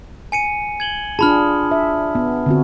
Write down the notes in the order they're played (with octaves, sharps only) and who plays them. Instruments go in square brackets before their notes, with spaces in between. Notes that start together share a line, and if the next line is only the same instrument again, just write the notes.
[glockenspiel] G#5 C#7 D#7
G#6 F#7 G7
[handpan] D4 F4 G#4 [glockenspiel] A5 B5 F6
[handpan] E5
B3
D3 C4 F#4